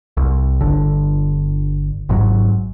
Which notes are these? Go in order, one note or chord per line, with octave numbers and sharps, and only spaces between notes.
C2
G1 D3
G#1 G#2 F#3